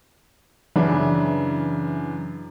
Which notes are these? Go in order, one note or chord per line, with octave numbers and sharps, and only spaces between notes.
F#2 C#3 E3 D4